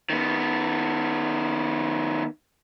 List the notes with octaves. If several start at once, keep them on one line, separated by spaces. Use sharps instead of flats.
D#3 B3